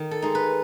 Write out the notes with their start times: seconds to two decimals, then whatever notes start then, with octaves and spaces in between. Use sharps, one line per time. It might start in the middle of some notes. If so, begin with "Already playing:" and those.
Already playing: D#3
0.11 A4
0.22 G#3 D#4
0.35 B4